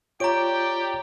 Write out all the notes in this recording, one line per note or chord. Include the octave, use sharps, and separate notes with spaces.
F4 G4 C#5 D5 G5 A#5 D7